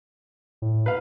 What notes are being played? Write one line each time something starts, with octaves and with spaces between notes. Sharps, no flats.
A2
B4 F5